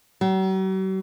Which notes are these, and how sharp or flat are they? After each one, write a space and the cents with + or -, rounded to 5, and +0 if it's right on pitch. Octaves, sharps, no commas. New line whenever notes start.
F#3 +45